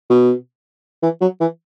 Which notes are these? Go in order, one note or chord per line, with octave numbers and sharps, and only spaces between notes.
B2
E3
F#3
E3